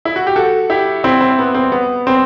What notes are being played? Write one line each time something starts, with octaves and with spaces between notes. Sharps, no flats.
E4
F#4
G4
F#4 A4
E4 G4
C4 E4
C4
B3
C4
B3
C4